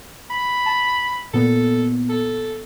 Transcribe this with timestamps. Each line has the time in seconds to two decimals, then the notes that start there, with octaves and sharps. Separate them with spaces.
0.30 B5
0.66 A5
1.34 A#2 B3 A4
2.09 A4